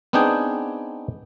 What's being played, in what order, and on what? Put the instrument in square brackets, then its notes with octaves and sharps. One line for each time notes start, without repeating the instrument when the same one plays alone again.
[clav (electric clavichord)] B3 C4 D4 D#4 G#4 G5